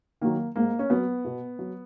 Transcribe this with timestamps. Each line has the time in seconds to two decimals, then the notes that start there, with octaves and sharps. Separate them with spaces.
0.21 D#3 F#3 A#3
0.56 G#2 A#3
0.79 C#4
0.90 F#3 B3
1.25 B2
1.59 F#3